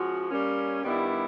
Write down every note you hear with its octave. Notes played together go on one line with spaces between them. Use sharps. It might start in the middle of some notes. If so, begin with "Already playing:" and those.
Already playing: F3 G#3 C#4 F#4
G3 A#3 C#4
G2 D#3 G3 B3 E4